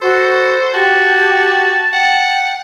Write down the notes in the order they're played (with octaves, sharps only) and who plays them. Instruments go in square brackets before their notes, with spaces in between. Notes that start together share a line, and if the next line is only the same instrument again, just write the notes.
[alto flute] F#4 [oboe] A4 [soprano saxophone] C5
[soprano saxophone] F#4 [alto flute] G4 [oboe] A5
[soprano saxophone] F#5 [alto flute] G5